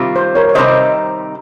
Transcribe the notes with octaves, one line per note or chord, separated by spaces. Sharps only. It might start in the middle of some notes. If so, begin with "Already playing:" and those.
Already playing: C3 D#3 G3 C4 F4
C5
A#4 C#5
C#5
C3 D#3 G3 C4 D#4 C5 D#5